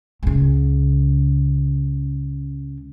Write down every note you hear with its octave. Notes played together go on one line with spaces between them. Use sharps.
C#2 C#3